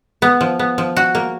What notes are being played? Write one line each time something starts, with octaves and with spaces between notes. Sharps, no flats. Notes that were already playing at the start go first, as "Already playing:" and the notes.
B3
F3
B3
F3
F#4
A#3